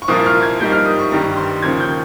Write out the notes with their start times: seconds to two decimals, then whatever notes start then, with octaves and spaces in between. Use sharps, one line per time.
0.02 C#6
0.08 C2 A#2 F3 A#3 D#6
0.26 F6
0.43 G#6
0.60 G#2 G3 A#3 G6
0.72 F6
0.86 D#6
0.99 C#6
1.12 G2 D#3 G3 A#5
1.37 C6
1.62 D#2 C#3 F3 A#3 G#6
1.80 G6